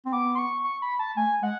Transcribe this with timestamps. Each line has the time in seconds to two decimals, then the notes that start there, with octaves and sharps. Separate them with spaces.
0.05 C4
0.12 B3 D6
0.35 C6
0.38 C#6
0.64 C#6
0.82 B5
0.99 A5
1.17 A3 G#5
1.42 G#3 F#5